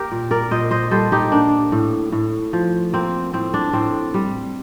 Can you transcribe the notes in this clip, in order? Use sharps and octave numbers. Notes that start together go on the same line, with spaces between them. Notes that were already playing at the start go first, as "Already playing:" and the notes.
Already playing: A#3 G4 A#4
A#2
A#4 D5
A#2 C5 D#5
C5 D#5
G3 A4 C5
D#4 G4
A#3 D4
A2
A2
F3
A#3 C4
A2 C4
D4
A2 C4
G3